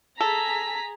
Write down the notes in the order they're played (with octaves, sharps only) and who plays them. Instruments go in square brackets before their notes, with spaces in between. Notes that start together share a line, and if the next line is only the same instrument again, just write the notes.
[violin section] G#4 A#5 B6 [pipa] A4